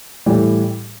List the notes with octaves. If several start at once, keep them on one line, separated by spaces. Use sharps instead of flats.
A2 E3 G3